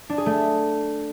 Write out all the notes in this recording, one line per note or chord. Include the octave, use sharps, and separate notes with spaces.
D4
G#4
A3